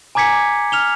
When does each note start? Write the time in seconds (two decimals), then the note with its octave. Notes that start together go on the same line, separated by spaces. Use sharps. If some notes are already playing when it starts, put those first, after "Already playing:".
0.15 G#5 A#5 D6 G#6 B6 C#7
0.72 F6 F7 G7